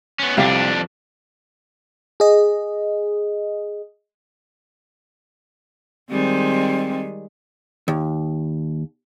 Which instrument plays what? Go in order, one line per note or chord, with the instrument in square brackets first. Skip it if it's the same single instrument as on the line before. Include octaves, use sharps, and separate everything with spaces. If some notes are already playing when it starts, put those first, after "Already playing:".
[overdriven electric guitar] B3 C#4
[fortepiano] C2 G4 F5 [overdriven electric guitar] F2 D4
[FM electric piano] G#4 D#5
[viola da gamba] D#3 G3 G#3 [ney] C4
[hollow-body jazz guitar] D#2